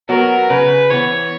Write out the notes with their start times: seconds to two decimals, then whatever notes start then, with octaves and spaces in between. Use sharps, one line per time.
0.09 F#3 B3 F#4 A#4
0.50 C#3 B4
0.90 E3 B3 C#5